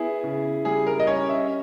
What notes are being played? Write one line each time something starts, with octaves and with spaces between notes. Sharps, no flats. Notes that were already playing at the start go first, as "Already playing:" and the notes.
Already playing: B3 E4 G#4
C#3
G3 G#4
A#4
D#5
C#4 C#5
E5